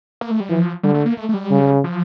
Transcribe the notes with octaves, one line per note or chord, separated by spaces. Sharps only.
A#3
A3
G3
E3 F3
D3 G3
A3
A#3
A3
A3
G3
C#3
F3